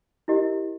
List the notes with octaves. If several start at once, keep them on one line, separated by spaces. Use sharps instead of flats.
E4 G4 A#4 D#5